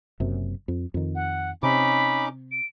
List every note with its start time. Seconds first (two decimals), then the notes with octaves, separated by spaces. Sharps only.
0.20 F#1 F#2 C3
0.68 F2
0.94 F2 D#3
1.15 F#5
1.63 C3 C#4 D#4 B5 D6
2.52 D7